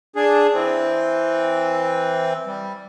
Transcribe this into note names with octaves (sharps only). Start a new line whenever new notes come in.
D4 G#4
E3 C4
G3